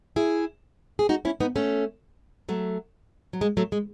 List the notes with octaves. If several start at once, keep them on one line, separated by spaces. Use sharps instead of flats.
E4 G#4
G#4
D#4 F#4
C#4 E4
B3 D#4
A3 C#4
F#3 A3
F#3
G#3
F#3 A3
G#3